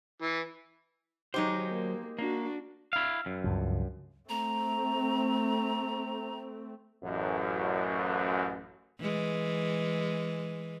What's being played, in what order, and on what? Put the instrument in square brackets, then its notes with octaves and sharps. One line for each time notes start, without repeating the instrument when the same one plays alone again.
[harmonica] E3
[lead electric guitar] F#3 C5 [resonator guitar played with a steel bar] G#3 D#4 G4
[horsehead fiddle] A#3
[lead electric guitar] A#3 [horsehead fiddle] D4 F#4
[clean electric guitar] E4 F5
F#2
[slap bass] C#2 G2 F3
[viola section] A3 C4 [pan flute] A#5
[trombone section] A1 F#2
[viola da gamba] E3 G#3